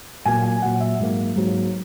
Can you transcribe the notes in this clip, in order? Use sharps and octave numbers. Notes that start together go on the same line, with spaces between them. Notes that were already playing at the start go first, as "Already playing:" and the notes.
A#2 F#3 A#3 G#5
G#5
A#2 F#3 A#3 F#5
E5
G#2 F#3 A#3
G#2 F#3 A#3